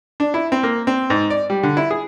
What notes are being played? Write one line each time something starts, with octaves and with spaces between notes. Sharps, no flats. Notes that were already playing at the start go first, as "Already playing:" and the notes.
D4
E4
C4
A#3
C4
G#2
D5
G3
D3
E4
G#4